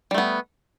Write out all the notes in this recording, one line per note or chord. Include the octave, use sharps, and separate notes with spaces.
G3 A3 B3